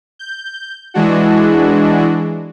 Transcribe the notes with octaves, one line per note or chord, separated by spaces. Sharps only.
G6
E3 G#3 D4 F#4